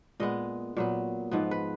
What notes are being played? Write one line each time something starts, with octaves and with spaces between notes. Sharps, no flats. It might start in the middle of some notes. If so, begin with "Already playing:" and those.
A#2 G#3 B3 D#5
A#2 F#3 B3
G#2 F3 B3
B4